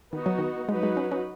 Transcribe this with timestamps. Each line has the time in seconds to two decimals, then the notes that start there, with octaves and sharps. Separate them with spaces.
0.13 D#3 B3 D#4 F#4
0.26 F#3
0.39 D#3
0.69 F#3 G#3 D#4 F#4 B4
0.83 G#3
0.97 C#4
1.11 C#4